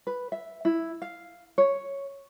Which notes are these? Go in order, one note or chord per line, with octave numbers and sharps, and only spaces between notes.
B4
E5
E4
F5
C#5